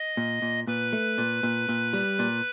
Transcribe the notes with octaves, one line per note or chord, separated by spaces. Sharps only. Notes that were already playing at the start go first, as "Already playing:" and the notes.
Already playing: D#5
A#2
A#2
A#2 B4
A3
A#2
A#2
A#2
G3
A#2